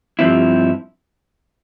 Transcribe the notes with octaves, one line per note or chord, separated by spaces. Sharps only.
G2 F3 C4 E4